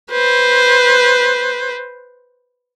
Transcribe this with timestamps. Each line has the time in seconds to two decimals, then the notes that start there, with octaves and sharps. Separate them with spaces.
0.11 B4 C5